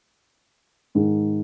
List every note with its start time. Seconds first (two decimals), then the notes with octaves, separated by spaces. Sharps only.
0.95 G#2 D#3 G#3